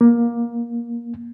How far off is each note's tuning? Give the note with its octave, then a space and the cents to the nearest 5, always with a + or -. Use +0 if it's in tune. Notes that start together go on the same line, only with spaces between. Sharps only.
A#3 +20